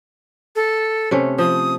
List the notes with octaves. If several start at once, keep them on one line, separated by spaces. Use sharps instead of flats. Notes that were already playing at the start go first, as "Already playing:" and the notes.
A4
C3 A3 C#4
F3 D#6